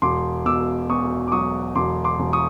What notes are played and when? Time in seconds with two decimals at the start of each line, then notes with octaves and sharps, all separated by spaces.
0.02 E1 C6 D6
0.46 B2 D6 E6
0.90 E2 C#6 D#6
1.28 D6
1.32 F#3 C#6 D#6
1.76 E1 C6 D6
2.04 C6 D6
2.19 E1
2.33 C#6 D#6